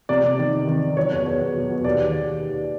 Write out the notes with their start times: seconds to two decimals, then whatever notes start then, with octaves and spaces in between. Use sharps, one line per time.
0.09 C3 D5
0.24 C3
0.39 D#3
0.53 C3
0.67 D#3
0.82 D#3
0.97 F#3 C#5
1.12 E2
1.26 E2
1.41 B2
1.56 F#3
1.71 B2
1.84 D#2 D5
2.00 D#2